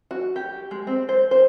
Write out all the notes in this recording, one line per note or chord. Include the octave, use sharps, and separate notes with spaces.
F#4
G4
G#3
C4
C5
C5